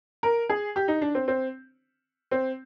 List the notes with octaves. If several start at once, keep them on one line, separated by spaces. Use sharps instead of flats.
A#4
G#4
G4
D#4
D4
C4
C4
C4